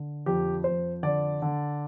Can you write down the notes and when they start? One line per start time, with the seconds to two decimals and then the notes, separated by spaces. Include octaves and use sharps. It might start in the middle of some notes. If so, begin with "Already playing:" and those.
Already playing: D3
0.26 F2 G4
0.64 F2 C5
1.03 D3 D5
1.42 D3